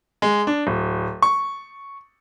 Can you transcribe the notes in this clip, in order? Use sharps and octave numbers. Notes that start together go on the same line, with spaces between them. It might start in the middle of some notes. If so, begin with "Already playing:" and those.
G#3
D4
D1
C#6